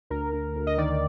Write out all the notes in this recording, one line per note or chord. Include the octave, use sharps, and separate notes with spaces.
D2 A#4
D2
D2
D#5
D#3 D5